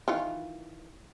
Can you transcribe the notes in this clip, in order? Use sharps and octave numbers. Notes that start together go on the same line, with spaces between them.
D#3 E3 F4